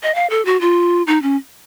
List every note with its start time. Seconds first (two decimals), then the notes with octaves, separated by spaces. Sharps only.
0.03 D#5
0.15 F5
0.30 A4
0.45 F#4
0.61 F4
1.07 D#4
1.22 C#4